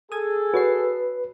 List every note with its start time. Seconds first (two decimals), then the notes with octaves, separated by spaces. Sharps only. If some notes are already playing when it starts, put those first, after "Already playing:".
0.12 G#4 A4 D#6 G#6
0.54 F#4 B4 C#5 C7